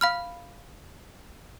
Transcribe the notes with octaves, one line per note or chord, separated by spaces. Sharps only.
F5 B5 F6